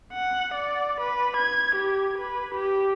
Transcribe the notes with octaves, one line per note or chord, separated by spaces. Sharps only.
F#5
D5
B4
G#6
G4
B4
G4